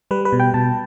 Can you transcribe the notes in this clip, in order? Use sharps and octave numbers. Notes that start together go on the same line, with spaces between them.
G3 B4
B4
B2
G5
B2 A5